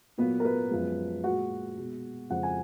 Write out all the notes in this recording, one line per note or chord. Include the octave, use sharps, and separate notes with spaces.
A#2 F#3 A#3 B3 B4
A#4
B3 B4
F#2 F3 G#3
A#2 G#3 F#4 F#5
B2 G#3
F2 C#3 G#3 F#5
G#5